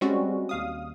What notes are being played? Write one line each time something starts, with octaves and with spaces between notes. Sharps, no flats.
G3 G#3 C4 C#4 F#4
D#2 F5 D#6